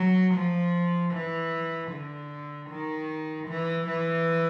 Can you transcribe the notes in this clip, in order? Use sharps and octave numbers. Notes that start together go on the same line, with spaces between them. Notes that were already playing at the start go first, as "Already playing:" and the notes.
Already playing: F#3
F3
E3
D3
D#3
E3
E3